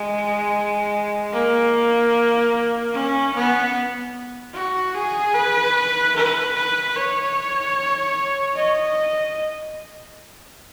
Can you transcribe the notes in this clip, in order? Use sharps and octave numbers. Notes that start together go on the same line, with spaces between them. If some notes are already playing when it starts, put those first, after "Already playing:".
Already playing: G#3
A#3
C#4
B3
F#4
G#4
B4
B4
B4
C#5
D#5